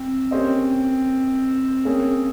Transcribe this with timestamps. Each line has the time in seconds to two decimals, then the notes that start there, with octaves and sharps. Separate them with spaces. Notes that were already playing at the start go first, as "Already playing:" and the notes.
Already playing: C4
0.31 A#3 C#4 G4 C5 D#5
1.85 A#3 C#4 G#4